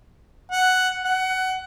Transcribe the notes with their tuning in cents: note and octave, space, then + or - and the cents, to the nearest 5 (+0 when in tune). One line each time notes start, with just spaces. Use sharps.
F#5 +5
F#5 +20